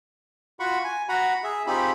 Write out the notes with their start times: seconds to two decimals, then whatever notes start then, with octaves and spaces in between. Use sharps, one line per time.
0.60 F4 F#4 F#5 B5 C#6
0.84 G#5
1.09 F#4 F#5 A#5 B5
1.44 G#4 E5
1.67 C4 D#4 F4 G4 G#4 B5